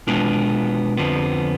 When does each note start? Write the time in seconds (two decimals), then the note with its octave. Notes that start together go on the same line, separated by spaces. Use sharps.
0.07 B2 G#3 B3 D4 F4
0.97 F2 D3 F3 B3